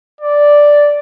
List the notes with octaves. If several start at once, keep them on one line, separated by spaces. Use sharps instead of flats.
D5